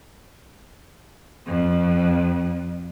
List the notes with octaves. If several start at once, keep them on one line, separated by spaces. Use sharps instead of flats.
F2